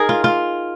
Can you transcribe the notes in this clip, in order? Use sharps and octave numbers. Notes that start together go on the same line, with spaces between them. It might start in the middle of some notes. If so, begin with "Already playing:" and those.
Already playing: D#4 G#4 A#4
F4
F4